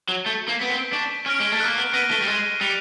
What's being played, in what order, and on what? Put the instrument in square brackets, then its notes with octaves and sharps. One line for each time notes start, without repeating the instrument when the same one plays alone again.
[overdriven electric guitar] F#3
[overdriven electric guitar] A3 [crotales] G6
[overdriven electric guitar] A#3
[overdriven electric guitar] B3 [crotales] B6 D7
[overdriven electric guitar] C4
[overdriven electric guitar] D4 [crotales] C#6
[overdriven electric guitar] C#4 [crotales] F6 A#6 D7
[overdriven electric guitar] G#3
A3
[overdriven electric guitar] A#3 [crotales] F#6
[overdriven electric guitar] B3
[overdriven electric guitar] B3 [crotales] A#6 D#7 G7
[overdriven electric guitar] A3
G3
[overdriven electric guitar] G#3 [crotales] F#6
[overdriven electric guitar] G3 [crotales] C#7 F7